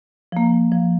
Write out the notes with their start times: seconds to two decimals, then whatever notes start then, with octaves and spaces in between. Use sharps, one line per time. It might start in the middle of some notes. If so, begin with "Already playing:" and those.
0.32 F3 A#3
0.72 F3